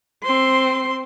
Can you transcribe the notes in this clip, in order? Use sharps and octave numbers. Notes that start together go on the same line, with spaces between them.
C4 C6